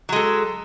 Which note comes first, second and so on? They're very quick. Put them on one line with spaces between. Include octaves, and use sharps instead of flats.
F#3 G#3 A4